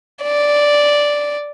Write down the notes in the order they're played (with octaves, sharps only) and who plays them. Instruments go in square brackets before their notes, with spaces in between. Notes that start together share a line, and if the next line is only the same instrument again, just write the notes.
[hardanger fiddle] D5